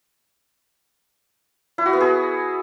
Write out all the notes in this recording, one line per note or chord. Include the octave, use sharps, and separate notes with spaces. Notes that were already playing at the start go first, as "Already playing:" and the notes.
E4
F#4
B3
G#4